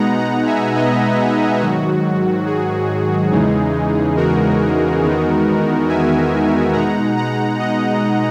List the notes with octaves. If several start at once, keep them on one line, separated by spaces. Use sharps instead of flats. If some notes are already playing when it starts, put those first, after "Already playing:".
Already playing: B2 G#3 B3 D#4 F#5 A#5
F#5 A#5
E5 G#5
B4 D#5
G#2 D#3 F#3 F#4
G#4
E2 C#3 E3 G#3 D#4
F#4 A#4
E2 D#3 G#3 B3 D#4
E5 G#5
B2 G#3 D#4 F#5 A#5
F#5 A#5
D#5 F#5